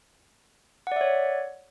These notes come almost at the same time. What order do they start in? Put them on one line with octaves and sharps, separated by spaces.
F#5 D5 E5 C#5